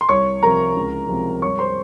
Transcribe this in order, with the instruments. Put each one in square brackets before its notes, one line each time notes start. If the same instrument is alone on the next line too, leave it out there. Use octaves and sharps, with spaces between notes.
[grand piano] C6
C2 C#5 C#6
C3 F3 A#4 A#5
C#2
C3 F3 G#3
G2 C#5 C#6
C5 C6